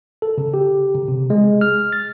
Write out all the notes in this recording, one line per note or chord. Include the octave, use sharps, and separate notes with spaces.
A4
C#3
G4
C#3
C3
G#3
F6
A6